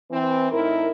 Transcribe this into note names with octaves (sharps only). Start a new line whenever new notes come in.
E3 C4
A2 D#4 E4 A#4